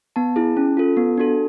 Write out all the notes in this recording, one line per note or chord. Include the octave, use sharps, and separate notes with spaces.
B3 A5
E4 G#4
C#4
F4 A4
B3
D4 F#4 A4